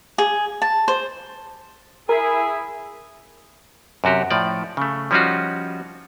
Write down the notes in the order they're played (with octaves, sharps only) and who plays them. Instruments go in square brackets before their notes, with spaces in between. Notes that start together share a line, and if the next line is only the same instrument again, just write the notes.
[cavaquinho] G#4
A5
C5
[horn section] E4 G#4 [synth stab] A#4
[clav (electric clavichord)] F#2 C3 F#4 G4
A2 F3 D5
C#3 A3
F3 G3 C#4 D#4 F4 F#4